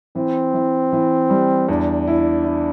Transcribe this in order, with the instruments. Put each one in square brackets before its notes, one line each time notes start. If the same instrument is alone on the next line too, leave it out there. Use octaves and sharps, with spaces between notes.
[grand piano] E3 [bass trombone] C4
[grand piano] E3
E3
G3
[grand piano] E2 [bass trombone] D4
[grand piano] E4
E4